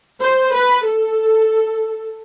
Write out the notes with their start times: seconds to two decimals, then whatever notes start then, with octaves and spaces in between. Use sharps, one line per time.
0.23 C5
0.54 B4
0.86 A4